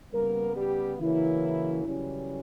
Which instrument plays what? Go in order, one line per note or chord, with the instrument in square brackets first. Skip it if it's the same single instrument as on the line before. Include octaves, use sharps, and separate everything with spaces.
[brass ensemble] C#3 G3 A#3 B3 A#4
G3 G4
C#3 E3 F#3 A#3 C#4 E4
F#2 C#3 E3 G3 C#4